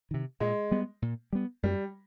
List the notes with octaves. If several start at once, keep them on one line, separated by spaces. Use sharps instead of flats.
C3 D#3
A#2 G#3
G3 B3
A#2
G3 B3
F#2 G3